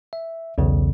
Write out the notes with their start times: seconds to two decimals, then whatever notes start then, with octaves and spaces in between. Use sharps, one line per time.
0.13 E5
0.58 B1 E2 C#3